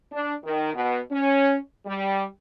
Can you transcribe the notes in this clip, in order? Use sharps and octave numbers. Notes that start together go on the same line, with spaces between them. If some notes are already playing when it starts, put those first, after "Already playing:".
D4
D#3
B2
C#4
G3